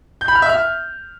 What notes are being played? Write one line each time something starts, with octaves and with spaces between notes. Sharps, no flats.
G6
B5
F6
E5
F6